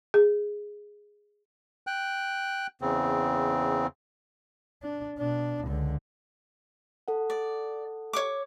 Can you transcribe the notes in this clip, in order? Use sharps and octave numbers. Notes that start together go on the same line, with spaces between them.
G#4
G5 F#6
E2 C#3 C4
D4
B2 D4
C#2 D3
A4 F#5
D5
C#5 C#6 D6